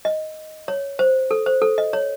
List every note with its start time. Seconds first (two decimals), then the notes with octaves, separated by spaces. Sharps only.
0.05 D#5
0.68 C#5
0.99 C5
1.31 A4
1.46 C5
1.62 A4
1.78 D#5
1.93 C#5